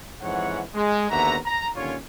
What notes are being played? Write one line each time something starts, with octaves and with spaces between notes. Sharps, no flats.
F2 G#2 E3 C#5 F#5
G#3
D#2 D3 B3 F#4 E5 A#5
A#5
D#2 D3 C#4 F4 C#5